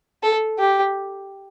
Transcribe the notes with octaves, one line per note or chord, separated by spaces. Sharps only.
A4
G4